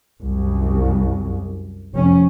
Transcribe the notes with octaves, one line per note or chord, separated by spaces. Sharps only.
C2 F#2
F1 C#4